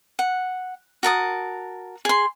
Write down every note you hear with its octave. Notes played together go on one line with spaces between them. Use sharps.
F#5
F#4 A#4 A5 D#6
G#4 C6